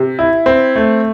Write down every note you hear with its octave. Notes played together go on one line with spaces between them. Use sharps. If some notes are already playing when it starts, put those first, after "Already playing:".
Already playing: C3
E4
C4
A3